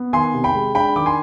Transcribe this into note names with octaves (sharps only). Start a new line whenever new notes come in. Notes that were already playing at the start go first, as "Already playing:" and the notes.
Already playing: B3
D#3 G#5 C6
C3
G5 B5
G#3
D4 G5 B5
D#3 D6
G#5 C6